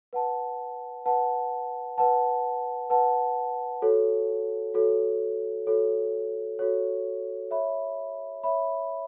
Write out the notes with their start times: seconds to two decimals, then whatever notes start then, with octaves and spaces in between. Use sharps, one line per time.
0.13 B4 F#5 A5
1.06 B4 F#5 A5
1.98 B4 F#5 A5
2.90 B4 F#5 A5
3.82 F#4 A4 C#5
4.74 F#4 A4 C#5
5.67 F#4 A4 C#5
6.59 F#4 A4 C#5
7.51 C#5 E5 B5
8.43 C#5 E5 B5